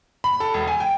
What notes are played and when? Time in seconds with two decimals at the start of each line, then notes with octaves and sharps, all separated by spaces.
0.24 B5
0.40 A4
0.54 E1
0.68 G#5
0.80 G5